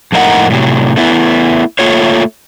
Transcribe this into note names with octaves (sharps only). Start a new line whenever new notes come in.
F2 A2 A#3 D#4 A#4 F#5
A2 C3 F#3
A3 B3 E4
A3 A#3 F4 C#5